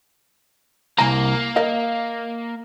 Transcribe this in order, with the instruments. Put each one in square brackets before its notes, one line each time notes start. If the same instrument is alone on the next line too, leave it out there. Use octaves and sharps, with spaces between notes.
[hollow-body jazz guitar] C2 G#5 A#5 [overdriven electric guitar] A#3
[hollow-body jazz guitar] A#4 D#5 F5